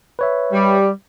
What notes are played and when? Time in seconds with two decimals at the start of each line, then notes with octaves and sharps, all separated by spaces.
0.19 B4 C#5 E5
0.53 G3